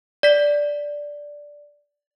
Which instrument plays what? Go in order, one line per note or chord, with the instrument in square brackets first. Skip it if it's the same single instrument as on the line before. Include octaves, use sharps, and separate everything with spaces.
[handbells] D5 B6